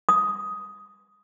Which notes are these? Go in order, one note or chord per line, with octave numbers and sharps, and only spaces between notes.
D#6